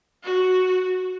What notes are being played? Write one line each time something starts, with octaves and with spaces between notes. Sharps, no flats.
F#4